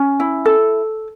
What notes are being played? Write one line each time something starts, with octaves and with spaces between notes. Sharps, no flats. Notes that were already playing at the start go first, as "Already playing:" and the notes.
Already playing: C#4
E4
A4